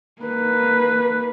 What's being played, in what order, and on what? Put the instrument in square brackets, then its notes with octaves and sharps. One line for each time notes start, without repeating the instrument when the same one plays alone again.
[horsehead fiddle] A#3 B4